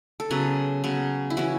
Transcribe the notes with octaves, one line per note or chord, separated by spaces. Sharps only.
A4
C#3 F#3 B3 B4
C#3 F#3 B3
E4
E3 C#4 F#4